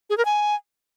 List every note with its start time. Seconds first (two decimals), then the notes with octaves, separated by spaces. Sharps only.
0.10 G#4
0.18 A#4
0.25 G#5